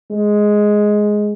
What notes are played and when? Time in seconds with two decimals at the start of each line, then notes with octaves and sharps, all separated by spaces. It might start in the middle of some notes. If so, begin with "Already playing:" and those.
0.11 G#3